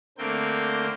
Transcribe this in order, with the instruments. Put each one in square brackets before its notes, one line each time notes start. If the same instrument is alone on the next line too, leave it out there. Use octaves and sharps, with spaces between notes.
[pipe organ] D3 A3 A#3 C4 G5